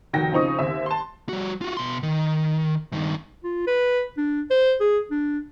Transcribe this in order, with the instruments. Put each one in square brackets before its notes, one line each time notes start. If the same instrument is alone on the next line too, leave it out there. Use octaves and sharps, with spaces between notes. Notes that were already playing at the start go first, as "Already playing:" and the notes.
[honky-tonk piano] F1 D#3 F#4 G5 A#6
C#3 F3 C4 D#4 C#6 D#6
D#2 C4 E5
A5 C6
[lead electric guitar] G3 F#4
F4 F#4
B2 C6
D#3
G2 D#3
[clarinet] F4
B4
D4
C5
G#4
D4